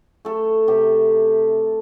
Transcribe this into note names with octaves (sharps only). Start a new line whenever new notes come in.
A3 A4
C3 G4